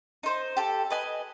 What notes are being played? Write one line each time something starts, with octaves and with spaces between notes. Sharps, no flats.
D#4 C5
G4 A4
B4 D#5 G#5